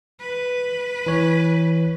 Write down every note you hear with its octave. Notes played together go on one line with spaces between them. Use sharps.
B4
E3 C#5